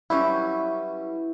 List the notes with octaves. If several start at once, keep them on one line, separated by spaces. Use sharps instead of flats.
F#3 G3 C#4 E4 B4